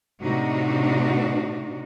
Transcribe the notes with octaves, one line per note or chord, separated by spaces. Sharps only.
A2 C3 D4 D#4 F#4